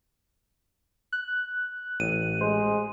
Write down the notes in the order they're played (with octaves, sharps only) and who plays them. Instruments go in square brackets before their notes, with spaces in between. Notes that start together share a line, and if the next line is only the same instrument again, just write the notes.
[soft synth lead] F#6
[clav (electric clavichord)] A1 [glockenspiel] D#7
[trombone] G#3 [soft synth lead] C5